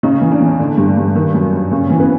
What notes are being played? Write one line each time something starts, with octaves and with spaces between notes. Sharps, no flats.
C#3 D#4
E3
D4
E2
D3
G2
G2
D#3
F#2
F#2
C#3 C#4
E3 C4
B3